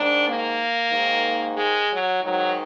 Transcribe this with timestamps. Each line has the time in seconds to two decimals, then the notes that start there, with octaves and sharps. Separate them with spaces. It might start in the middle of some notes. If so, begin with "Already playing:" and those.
Already playing: G#2 D#3 D4
0.25 A#3
0.91 G#2 D#3
1.57 G#3
1.89 F#3
2.21 G#2 D#3 F#3